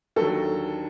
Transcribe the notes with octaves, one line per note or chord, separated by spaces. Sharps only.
D#2 D3 F#3 A4